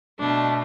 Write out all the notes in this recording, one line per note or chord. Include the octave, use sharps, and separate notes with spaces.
B2 A3 D4